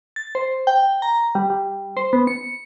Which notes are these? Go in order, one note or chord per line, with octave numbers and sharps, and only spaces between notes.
A6
C5
G5
A#5
G3
G3
C5
B3
C#7